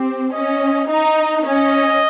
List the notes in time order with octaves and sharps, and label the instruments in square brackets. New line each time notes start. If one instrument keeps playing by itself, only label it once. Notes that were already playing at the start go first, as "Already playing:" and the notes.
Already playing: [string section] C4 [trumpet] G4
[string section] C#4 [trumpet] D#5
[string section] D#4 [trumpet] D#5
[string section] C#4 [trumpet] D#5